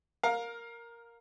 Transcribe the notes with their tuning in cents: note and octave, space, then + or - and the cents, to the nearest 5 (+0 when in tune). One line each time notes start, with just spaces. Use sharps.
A#4 +0 F5 +20